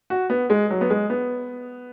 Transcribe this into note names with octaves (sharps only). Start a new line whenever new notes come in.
F#4
B3
G#3
F#3
B3
G#3
B3